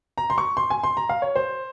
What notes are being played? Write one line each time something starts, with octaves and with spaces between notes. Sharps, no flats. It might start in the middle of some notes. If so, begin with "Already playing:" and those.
A#5
C6
C#6
C6
G#5
C6
A#5
F5
C#5
C5